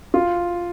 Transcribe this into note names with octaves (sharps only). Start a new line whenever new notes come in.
F4